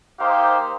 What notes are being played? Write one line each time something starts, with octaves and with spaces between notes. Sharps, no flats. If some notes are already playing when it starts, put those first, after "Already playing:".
A#3 D#4 G4 C5 F5